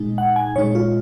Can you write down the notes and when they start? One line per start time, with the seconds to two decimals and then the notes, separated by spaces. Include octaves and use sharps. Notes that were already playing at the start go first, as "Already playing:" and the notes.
Already playing: A#2 G#3 D#4
0.18 F#5
0.36 G#5
0.56 A#2 G#3 D#4 C#5
0.75 F4